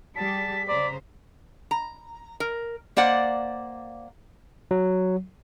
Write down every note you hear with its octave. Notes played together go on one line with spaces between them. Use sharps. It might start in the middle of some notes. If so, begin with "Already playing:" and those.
G3 G4 G#4 A5 B6
C#3 C5 D5 A#5
A#5
A#4
A#3 C5 D5 F#5
F#3